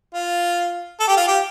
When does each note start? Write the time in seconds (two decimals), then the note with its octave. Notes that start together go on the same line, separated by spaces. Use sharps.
0.14 F4
1.00 A4
1.08 G4
1.17 F4
1.27 G4